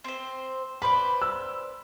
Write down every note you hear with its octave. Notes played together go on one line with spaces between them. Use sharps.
C4 C5
B4 C5 D5 B5
E6